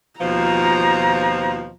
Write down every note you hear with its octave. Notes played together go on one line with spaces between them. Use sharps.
D#2 B2 F3 A#5